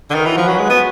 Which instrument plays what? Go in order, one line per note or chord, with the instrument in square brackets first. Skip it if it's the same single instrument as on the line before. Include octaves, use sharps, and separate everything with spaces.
[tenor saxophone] D3
[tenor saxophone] D#3 [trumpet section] C#4 F#4 B4
[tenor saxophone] E3
F3
F#3
G#3
B3